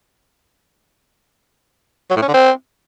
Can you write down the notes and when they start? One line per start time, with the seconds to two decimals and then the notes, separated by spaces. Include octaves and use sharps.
2.10 F#3
2.16 A2
2.22 C#4
2.28 D3
2.34 C4